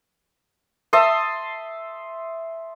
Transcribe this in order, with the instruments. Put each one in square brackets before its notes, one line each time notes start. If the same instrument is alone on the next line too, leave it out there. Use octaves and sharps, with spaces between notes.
[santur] E5 A5 C6 D#6